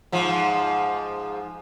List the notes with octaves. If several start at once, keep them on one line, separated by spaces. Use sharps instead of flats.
G#2 F3